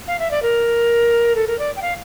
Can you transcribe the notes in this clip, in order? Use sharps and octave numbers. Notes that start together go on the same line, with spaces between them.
F5
E5
D5
A#4
A4
A#4
D5
G5
F5